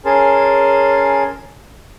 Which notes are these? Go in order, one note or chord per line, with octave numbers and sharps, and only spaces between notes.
C#4 G#4 A#4 A5 C6